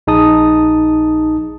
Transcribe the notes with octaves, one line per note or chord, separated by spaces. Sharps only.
A#1 D#4 G#4 A5 D#6